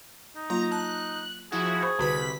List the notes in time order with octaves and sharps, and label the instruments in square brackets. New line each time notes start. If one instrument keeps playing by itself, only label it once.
[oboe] D#4
[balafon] F#3 A#3 F4 [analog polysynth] A#5
[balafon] A5 [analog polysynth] F#6
[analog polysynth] F3 E4 F#4 [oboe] G#4
[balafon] C5 B5 C#6
[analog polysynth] C2 B5 B6 [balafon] D3 F#4 B4